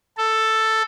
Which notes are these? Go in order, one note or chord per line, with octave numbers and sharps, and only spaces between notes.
A4